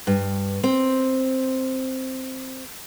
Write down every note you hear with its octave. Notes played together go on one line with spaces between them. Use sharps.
G2
C4